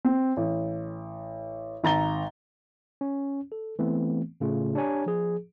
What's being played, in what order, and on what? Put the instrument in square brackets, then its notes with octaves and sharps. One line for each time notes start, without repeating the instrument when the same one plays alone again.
[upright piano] C4
A1
G#1 A#5 A6 G7
[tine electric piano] C#4
A4
E3 A3 B3 C4
A2 C#3 A3 F4
D4 G4 C#5 G#5 A#5
F3 G#4